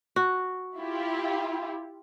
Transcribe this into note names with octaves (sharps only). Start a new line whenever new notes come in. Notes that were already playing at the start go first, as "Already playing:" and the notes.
F#4
E4 F4 G4